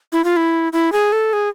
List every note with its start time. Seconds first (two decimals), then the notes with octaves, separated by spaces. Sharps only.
0.12 E4
0.24 F4
0.37 E4
0.73 E4
0.92 G#4
1.12 A4
1.33 G#4